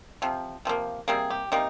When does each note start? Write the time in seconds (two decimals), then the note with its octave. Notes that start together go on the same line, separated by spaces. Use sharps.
0.22 C3 F3
0.65 C3 F3 A#3
1.08 C3 G3 A#3 G#4
1.30 G4
1.52 C3 G3 A#3 D#4